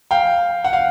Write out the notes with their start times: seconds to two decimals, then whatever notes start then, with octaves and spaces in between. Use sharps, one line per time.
0.11 F5 G5
0.64 F#5
0.73 F5